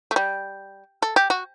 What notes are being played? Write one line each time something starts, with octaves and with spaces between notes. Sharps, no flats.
A3
G3
A4
G4
F#4